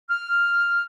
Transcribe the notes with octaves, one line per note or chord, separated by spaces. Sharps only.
F6